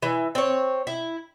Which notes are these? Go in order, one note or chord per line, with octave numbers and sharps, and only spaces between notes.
E3
C4 C#5
E4